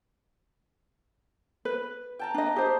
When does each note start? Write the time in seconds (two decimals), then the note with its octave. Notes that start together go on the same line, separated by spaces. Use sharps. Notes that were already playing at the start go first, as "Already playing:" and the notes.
1.65 B4
2.19 G5 A5 A#5
2.34 D4 D#5
2.56 G4 G#4 C5